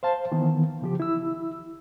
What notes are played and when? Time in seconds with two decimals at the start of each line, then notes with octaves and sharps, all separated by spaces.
0.03 C5 F5 A5
0.32 D#3 E3 B3
0.82 C#3 F3 G4
1.00 E4 E6